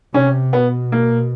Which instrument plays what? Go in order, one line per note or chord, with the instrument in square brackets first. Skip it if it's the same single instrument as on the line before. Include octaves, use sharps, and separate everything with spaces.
[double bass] C3 [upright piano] C#4
[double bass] B2 [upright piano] B3
[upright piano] A#3